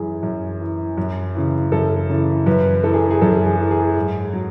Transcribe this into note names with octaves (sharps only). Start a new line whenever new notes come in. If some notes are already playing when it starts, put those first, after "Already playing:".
Already playing: F#2 E3 G#4
F#2
E3
F#2
C#3 E3
F#2 A4
C#3 E3
F#2 B4
E3 A4
G#4
G#4
F#2 A4
G#4
E3
G#4
G#2
F#3